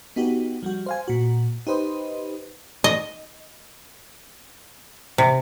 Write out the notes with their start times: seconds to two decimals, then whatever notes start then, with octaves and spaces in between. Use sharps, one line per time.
0.16 B3 D#4 F#4 G4
0.63 F3 G3 F#4
0.86 C5 F5 G#5
1.08 A#2 F#4
1.67 D#4 G4 B4 C5 D#5
2.84 D#5
5.18 C3